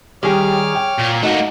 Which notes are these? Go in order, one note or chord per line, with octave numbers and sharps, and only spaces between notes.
D#3 G3 G4 G#4 C#5 D5 D6 F6
G5
A#2 F4
A3 A#3 D4 D#4 F#4 F#5